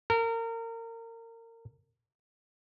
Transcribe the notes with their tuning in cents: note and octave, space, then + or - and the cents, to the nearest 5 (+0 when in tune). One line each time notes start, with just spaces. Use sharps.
A#4 -30